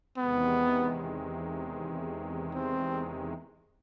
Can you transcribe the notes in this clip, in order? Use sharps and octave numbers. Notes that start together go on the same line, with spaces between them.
E2 C3 D#3 G#3 B3
C4